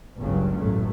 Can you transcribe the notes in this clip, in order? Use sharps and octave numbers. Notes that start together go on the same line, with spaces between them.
G1 C#2 G2 A#2 C#3 F#3
A1 F#2 A3